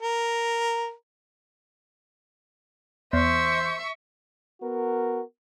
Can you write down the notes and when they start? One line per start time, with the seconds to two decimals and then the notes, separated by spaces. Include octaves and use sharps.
0.02 A#4
3.13 E2 C5 E5 C#6
4.62 B3 F#4 A#4